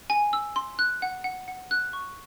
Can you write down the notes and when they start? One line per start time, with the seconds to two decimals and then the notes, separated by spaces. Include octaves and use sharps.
0.10 G#5
0.33 E6
0.56 C6
0.79 F#6
1.02 F#5
1.24 F#5
1.48 F#5
1.71 F#6
1.93 C#6